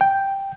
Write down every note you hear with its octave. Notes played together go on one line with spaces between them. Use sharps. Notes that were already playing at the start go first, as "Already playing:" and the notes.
G5